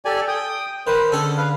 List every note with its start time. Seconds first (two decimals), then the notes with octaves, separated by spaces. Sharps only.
0.05 G4 A4 D5 G#5
0.28 G5 D#6
0.87 D#3 B4 C5
1.12 D3 C#4 G#4 A4
1.37 B4 F5